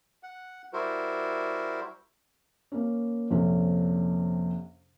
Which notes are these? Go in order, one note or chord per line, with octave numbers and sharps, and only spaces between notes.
F#5
G3 E4 F#4 A#4 C5
A#3 C#4
A#1 F2 C3 C#4 A4